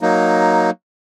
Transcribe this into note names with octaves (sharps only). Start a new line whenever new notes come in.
F#3 A#3 D#4